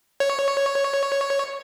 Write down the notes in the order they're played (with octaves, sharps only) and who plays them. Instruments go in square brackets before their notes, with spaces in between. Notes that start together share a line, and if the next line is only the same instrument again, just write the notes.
[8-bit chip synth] C#5